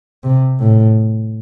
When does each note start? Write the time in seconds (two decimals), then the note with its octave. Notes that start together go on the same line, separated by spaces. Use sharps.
0.23 C3
0.59 A2